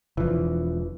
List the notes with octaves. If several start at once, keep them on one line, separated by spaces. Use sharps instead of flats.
E1 E3 F3